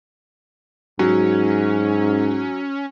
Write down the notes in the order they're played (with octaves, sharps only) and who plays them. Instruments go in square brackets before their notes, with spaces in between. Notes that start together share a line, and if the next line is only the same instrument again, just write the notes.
[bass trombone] G#2 [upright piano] F#3 [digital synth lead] C#4